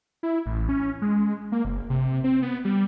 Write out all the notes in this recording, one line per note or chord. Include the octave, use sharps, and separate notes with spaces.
E4
A1
C#4
G#3
A#3
F#1
C3
C4
B3
G3